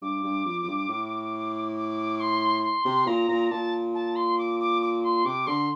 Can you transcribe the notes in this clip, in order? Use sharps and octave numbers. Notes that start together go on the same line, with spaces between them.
G2 D6
G2
F2
F2
G2
A2
D6
C6
C6
C3
A#2 A#5
A#2
A#2 A5
A5
C6
D6
D6
D6
C6
C3 D6
D3 C6